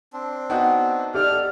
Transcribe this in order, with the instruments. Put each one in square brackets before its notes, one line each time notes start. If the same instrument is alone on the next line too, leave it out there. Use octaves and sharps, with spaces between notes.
[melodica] C4 D4
[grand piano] B3 D#4 F#4 [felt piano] G5
[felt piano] G4 D5 [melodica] A4 [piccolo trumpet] F6